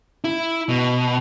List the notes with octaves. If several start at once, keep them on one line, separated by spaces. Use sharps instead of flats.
E4
B2